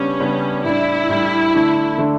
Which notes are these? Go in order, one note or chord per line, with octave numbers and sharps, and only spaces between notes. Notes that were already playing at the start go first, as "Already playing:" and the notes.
Already playing: C#3 G3 B3 C#4 D4 G4
C#3 G3 B3 D4 G4
A2 G3 D4 E4
A2 G3 D4
D3 A3 D4
D3 A3 D4